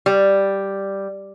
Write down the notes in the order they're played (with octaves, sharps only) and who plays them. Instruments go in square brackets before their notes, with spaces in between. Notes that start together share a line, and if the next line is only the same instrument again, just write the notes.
[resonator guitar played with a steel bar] G3